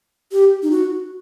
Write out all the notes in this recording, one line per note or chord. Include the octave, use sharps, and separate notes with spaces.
G4
D#4
F#4